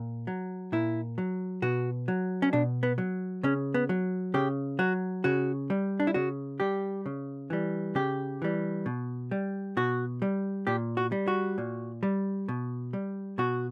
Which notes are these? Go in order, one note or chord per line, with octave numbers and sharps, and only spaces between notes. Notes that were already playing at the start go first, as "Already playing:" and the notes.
Already playing: A#2
F#3
A#2 E4
F#3
B2 F#4
F#3
C#4
B2 D4
B3
F#3
C#3 C#4
B3
F#3
C#3 G4
F#3 F#4
C#3 F#4
G3
D4
E4
C#3 F#4
G3 G4
C#3
E3 G3
C#3 G4
E3 G3
B2
G3
B2 F#4
G3
A#2 G4
F#4
G3
F#4
A#2
G3
B2
G3
B2 F#4